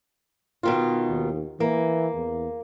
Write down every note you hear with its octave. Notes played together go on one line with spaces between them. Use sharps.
B2 D#3 F4
D#2
E3 A#3
E2